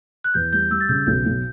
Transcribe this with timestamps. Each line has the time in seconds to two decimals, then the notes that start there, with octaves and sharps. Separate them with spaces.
0.24 F#6
0.34 E2 G6
0.53 G3 G6
0.71 G3 E6
0.81 A6
0.89 C#3 G6
1.07 B1 G6
1.25 B1